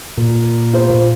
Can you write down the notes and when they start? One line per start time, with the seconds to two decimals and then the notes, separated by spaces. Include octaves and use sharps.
0.18 A#2
0.73 F4 C5